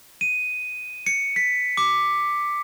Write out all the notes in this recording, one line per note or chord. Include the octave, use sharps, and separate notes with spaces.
D#7
C#7
B6
D6